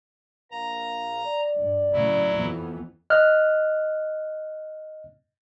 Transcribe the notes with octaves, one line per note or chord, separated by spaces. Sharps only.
A#1 A#4 F5 A#5
D5
G2
A2 C#3 F#3 E4
F2 E3 B3
D#5 F6 F#6